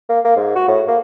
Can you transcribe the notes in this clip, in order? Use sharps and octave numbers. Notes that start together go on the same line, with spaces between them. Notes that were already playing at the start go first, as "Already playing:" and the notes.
A#3
A#3
G#2
F#4
A2
A#3